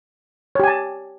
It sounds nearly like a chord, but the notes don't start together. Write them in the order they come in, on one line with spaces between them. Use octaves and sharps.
C#5 G4 G#5 A5